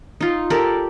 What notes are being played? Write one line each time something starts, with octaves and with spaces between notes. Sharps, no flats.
D#4 F4
G4 A4 A#4 D5